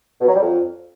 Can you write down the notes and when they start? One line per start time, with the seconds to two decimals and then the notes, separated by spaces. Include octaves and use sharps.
0.21 B2
0.28 F#3
0.35 G3
0.42 F2